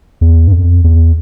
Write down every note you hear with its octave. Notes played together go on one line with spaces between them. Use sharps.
E2
G2
F2
E2